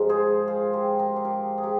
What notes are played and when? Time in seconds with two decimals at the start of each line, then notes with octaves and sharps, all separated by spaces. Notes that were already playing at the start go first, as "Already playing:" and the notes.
Already playing: G#2 F3 G#3 A#4
0.09 G#4 C5
0.48 F4 G#4
0.73 G4 A#4
0.99 G4 A#4
1.16 C5
1.25 G4 A#4
1.58 G#4
1.64 G4 A#4